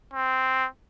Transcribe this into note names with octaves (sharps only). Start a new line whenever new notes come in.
C4